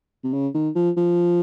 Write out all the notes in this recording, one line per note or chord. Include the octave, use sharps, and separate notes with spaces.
C3
C#3
D#3
F3
F3